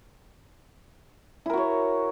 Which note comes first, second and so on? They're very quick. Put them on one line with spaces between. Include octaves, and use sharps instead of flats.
E4 A#4 F#4 C#5